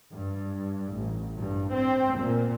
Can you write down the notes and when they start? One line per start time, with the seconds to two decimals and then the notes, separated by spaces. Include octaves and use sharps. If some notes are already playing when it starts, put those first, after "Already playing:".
0.12 G2
0.94 A1
1.38 G2
1.72 C4
2.18 A#2